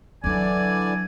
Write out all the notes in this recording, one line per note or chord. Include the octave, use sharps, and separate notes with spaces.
D3 E3 F#3 D4 D5 G#5